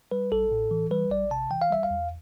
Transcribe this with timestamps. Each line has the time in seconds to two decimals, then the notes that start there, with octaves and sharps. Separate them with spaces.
0.11 G3 B4
0.32 A1 A4
0.52 A2
0.71 E3
0.91 G3 B4
1.11 A1 D5
1.31 C3 A5
1.51 E3 G5
1.62 F5
1.71 G3 E5
1.83 F5
1.90 E2